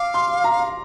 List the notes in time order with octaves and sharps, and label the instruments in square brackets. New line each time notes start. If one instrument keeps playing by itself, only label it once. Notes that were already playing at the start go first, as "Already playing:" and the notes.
Already playing: [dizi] F5 [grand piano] D6
[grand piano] C6
A#5